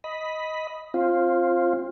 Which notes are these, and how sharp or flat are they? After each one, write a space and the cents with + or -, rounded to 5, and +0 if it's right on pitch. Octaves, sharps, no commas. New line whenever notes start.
D#5 +10 B5 +0
C4 +25 F4 +0